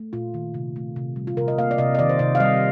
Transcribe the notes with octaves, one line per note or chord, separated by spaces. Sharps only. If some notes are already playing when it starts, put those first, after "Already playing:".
Already playing: A3
A#2 F4
D#3
C3
A3
C3
G3
F4
C3 A#4
D#5
A#3 F5
D5
C3 D#5
D#5
D#3 D5
C5
C3 D#5
F5
G3 D#5